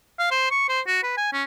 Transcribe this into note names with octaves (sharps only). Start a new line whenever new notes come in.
F5
C5
C#6
C5
F#4
B4
G#5
C#4